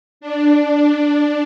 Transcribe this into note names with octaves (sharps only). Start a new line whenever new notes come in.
D4